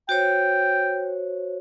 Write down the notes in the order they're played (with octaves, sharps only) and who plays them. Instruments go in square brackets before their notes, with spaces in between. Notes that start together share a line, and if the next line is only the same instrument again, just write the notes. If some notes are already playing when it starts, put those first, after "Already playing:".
[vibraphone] F#4 C5 C#5 [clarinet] G5